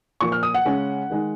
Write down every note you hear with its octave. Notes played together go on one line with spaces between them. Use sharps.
A#2 F3 A#3 C#6
F6
D#6
F#5
C#3 G#3 C#4
D#3 G#3 D#4